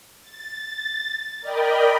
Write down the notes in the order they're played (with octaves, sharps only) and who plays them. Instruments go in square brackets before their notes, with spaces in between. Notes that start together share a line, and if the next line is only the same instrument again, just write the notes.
[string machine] A6
A#4 D5 D#5 G5 B5